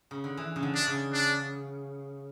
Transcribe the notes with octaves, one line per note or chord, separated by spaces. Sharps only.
C#3
D3
E3
C#3
D3
D4
C#3
D4